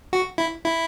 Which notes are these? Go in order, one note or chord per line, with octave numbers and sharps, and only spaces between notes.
F#4
E4
E4